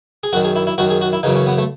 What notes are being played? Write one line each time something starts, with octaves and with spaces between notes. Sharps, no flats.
G#4
F#2 D#3 F#4
G#4
E4
E4
F#2 D#3 F#4
G#4
F#4
E4
F#2 C#3 E3 D#4
C#4
B3
A3